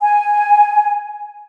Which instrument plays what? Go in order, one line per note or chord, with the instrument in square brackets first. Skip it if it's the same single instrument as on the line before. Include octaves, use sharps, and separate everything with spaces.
[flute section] G#5